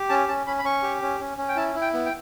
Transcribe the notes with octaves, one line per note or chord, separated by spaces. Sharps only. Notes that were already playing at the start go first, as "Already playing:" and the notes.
Already playing: G4
C#4 A5
C#4 A5
C#4 B5
B5
C#4 C#6
G4
C#4
C#4
C#4
G5
E4 A5
E4
G5
B3
G5